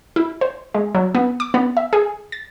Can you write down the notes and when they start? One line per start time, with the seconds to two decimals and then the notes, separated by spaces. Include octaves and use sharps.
0.16 E4
0.41 C5
0.74 G#3
0.95 F#3
1.15 B3
1.40 D6
1.54 B3
1.77 E5
1.93 G#4
2.32 A6